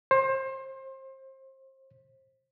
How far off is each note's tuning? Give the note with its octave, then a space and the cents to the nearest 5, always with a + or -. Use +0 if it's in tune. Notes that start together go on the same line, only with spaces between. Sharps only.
C5 +30